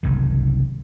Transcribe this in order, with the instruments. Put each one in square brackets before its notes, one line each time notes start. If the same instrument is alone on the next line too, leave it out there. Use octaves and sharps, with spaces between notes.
[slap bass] F#1 C2 G#2 D#3